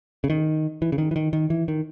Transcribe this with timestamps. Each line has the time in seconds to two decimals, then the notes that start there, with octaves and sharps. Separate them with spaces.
0.24 C#3
0.30 D#3
0.82 E3
0.92 C#3
0.98 D#3
1.11 E3
1.16 D#3
1.33 D#3
1.50 E3
1.68 D#3